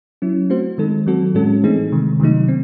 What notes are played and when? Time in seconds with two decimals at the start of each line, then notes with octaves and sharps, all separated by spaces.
0.22 F#3 C#4 E4
0.50 A3 C4 F#4 C5
0.78 D#3 G#3 D#4 A4
1.06 D#3 F#3 C4 F#4 A4
1.35 A2 G#3 C#4 F#4 A4
1.63 E3 A3 C4 D#4 G#4
1.92 C3 D#3 G#3
2.20 C3 D#3 F#3 A3 D#4
2.48 C4